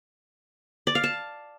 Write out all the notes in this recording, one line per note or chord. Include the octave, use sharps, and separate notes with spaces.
D5
F5
A5